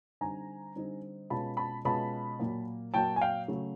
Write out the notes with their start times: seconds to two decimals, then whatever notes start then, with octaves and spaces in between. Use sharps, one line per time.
0.21 D3 G3 C4 D#4 G#5 A#5
0.76 D3 G3 C4 D#4
1.30 B2 G#3 C#4 F4 A5 B5
1.57 A5 B5
1.85 B2 G#3 C#4 F4 A5 B5
2.39 A#2 F#3 A#3
2.94 A#2 F#3 A#3 G5 A5
3.16 G#5
3.21 F5 G5
3.48 C#3 F#3 A3